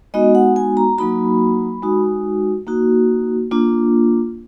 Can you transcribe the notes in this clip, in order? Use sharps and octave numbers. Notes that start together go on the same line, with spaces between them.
G#3 B3 D#4 F#4 D#5
F#5
G#5
A#5
F#3 A#3 D#4 F#4 B5
G#3 D#4 F#4
A#3 D#4 F#4
A#3 D4 F4